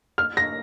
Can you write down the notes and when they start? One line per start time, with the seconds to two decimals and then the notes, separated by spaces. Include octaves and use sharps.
0.18 F6
0.37 A#6